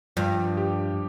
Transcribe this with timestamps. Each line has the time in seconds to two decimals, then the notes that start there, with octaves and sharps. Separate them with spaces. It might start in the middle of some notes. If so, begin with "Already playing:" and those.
0.17 G2 F3
0.57 G4